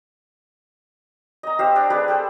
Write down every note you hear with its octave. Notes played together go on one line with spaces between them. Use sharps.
D#5 A#5
G4 C5 F5 E6
D4
G#4 B4 C#5 D5
G4 A4 C5